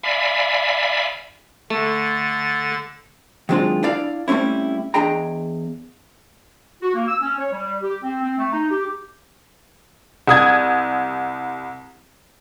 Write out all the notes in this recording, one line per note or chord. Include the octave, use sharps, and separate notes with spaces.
D5 E5 F5 G#5 B5
D3 A3 A6
D#3 F#3 G#3 C4 D4 F4
D4 E4 D5 F5
G3 A3 C4 C#4 E4
E2 D4 G#4 D#5 G5 A#5
F#4
A#3
E6
C#4
C#5
G3
G4
C4
C4
A3
D#4
G4
C2 D#6 G#6